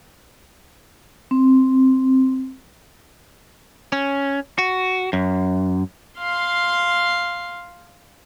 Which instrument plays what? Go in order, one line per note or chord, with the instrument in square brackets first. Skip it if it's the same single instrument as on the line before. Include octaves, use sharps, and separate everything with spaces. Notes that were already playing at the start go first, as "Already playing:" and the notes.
[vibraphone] C4
[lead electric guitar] C#4
F#4
F#2
[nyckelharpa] F5 C6